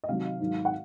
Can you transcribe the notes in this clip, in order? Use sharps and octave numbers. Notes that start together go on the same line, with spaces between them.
D#5
C3 D#3 F#3 F5
G#2 D#3 F#3
F#5